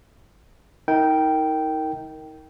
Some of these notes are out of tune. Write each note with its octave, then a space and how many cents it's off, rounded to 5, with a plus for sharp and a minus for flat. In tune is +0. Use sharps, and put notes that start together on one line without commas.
D#4 +35 A#4 -10 G5 -10